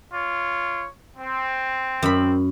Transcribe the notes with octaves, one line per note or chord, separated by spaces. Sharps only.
F4 C#5
C4
F#2 B5